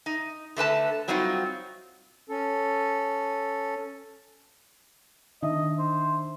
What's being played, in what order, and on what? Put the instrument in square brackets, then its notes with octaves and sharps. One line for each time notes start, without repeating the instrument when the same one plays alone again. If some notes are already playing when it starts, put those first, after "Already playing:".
[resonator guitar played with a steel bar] D#4
D3 A3 B4 A5
F#3 G3 C4 D#4 F4 F#4
[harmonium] C#4 A4
[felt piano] D#3 D4 E5 [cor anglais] D#5
[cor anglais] C5